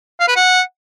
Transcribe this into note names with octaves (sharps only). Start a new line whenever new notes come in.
F5
B4
F#5